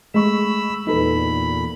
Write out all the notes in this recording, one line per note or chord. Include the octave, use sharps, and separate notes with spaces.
G#3 A3 B5 C#6 E6
E2 A#2 D#4 A4 B4 B5